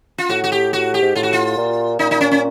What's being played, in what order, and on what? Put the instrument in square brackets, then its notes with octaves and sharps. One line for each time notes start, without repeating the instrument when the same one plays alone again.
[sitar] F4
[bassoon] A2 [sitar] F#4
[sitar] F#4
G4
F#4
G4
[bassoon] G#2
[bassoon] A2 [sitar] F4
[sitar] F#4
F4
[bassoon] A#2
[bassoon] A#2 [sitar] D#4
[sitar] D#4
C#4
C#4